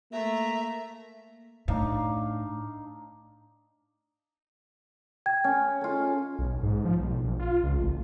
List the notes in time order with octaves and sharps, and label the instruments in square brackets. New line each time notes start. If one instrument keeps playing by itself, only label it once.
[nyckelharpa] A3 A#5 [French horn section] A#3 [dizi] E5
[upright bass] A2 [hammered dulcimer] D4 D#4 F5
[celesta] G5 G#6
[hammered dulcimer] C#4
F4 A4
[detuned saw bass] B1
G#2
F3
B1
A#1
F4
C#2
A1